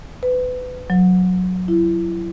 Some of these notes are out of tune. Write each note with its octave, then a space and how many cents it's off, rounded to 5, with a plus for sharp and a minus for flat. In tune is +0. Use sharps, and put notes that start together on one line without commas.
B4 +30
F#3 -15
E4 +30